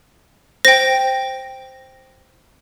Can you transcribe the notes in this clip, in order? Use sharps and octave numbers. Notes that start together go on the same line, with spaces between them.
C5 G5 A#6